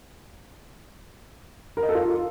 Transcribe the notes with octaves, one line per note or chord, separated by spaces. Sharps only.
A#4
D#5
A4
F4